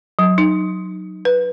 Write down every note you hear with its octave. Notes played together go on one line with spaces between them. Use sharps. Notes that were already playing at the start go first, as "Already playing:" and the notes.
F#3
D#4
B4